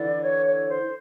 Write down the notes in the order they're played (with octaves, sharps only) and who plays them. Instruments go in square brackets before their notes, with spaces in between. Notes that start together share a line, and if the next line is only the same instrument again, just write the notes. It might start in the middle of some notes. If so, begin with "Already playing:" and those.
Already playing: [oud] D3 E3 [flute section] D5
[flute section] C#5
C#5
C5